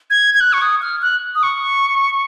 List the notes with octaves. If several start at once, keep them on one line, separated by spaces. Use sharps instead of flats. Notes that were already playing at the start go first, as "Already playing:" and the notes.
G#6
G#6
F#6
C#6
D#6
F6
F#6
D#6
C#6